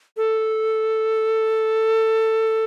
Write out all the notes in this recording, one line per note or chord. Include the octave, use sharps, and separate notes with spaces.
A4